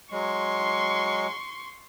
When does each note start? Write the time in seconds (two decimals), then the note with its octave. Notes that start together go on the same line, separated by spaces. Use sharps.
0.12 F#3 G#3 C6 C#6